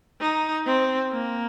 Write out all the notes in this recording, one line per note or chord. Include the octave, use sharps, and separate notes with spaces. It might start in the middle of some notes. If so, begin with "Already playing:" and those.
D#4
C4
A#3